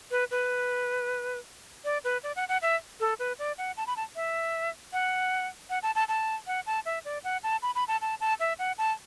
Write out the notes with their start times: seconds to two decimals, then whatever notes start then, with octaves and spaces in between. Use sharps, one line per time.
0.11 B4
0.31 B4
1.85 D5
2.04 B4
2.23 D5
2.36 F#5
2.49 F#5
2.62 E5
3.00 A4
3.19 B4
3.39 D5
3.58 F#5
3.77 A5
3.87 B5
3.97 A5
4.16 E5
4.93 F#5
5.70 F#5
5.83 A5
5.95 A5
6.08 A5
6.47 F#5
6.66 A5
6.86 E5
7.05 D5
7.24 F#5
7.43 A5
7.63 B5
7.75 B5
7.88 A5
8.01 A5
8.21 A5
8.40 E5
8.59 F#5
8.78 A5